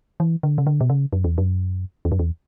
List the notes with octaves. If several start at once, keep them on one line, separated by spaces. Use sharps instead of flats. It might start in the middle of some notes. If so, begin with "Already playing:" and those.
E3
D3
C#3
D3
B2
C#3
F#2
E2
F#2
E2
F#2
E2